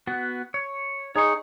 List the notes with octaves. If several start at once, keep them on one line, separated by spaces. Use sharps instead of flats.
B3 F#4
C#5
D#4 G#4 C#5 C#6